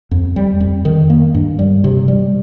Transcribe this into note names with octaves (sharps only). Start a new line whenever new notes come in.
F2
G3
F2
D#3
A#3
G2
G3
C3
G3